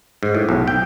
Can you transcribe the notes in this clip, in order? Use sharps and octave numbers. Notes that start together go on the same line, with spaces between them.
G#2
A2
B1
G5